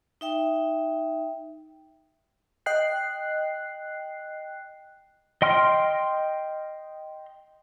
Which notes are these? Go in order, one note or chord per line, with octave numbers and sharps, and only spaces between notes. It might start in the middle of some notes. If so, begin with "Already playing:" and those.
D#4 E5 G5
D#5 G5 F#6 C7
D#5 G5 C6 F6